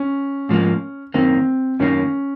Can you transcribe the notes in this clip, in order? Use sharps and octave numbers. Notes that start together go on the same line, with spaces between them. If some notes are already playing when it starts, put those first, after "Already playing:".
Already playing: C#4
G#2 F3 A#3
F#2 D#3 A#3 C4
F#2 D#3 A#3 C#4